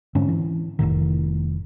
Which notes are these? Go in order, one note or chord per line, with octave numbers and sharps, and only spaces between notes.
G#2 D3 C4 C#4
E3
F1 B1 A2 D#3